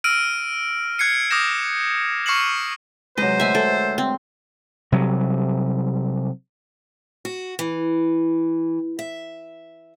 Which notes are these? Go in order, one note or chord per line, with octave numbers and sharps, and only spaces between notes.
E6 F6 A#6 D7 D#7
F6 F#6 G#6 C7 C#7 D#7
D6 D#6 F6 G6 A#6 E7
C#6 F6 C7 C#7 E7 F#7
C3 F#3 G#3 B4 C5 D#5
D2 E5 G#5
A4
C4
C3 F#3 G3
F#4
E3
E5